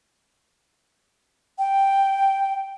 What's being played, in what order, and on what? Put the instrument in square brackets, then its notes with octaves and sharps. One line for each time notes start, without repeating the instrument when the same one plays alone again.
[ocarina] G5